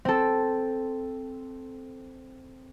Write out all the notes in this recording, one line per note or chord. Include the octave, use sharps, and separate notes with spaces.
C4 A4